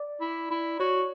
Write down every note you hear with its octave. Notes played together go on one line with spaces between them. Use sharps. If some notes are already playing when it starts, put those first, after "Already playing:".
Already playing: D5
E4
E4
F#4 C#5